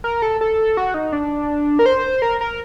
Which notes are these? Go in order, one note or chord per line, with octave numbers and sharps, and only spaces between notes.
A#4
A4
A4
F#4
D#4
D4
A#4
C5
A#4
A#4